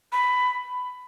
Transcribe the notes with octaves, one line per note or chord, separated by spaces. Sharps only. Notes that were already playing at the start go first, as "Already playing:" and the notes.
B5